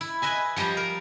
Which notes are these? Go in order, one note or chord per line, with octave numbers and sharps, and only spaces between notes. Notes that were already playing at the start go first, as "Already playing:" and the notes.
E4
B4 D#5 E5 G#5
F3 G3 G4 D#5 A#5
A#4